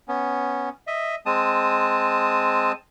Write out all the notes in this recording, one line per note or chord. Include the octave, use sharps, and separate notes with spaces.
B3 C#4
D#5 E5
G#3 C4 A5 D#6